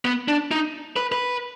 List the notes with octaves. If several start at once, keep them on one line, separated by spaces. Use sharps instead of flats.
B3
D4
D#4
B4
B4